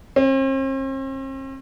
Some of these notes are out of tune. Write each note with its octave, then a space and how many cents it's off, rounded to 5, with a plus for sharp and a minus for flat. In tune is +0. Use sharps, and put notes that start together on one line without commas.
C4 +45